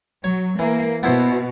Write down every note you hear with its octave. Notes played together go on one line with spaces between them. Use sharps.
F#3 C#5
E3 A#3
B2 B3 E4 C5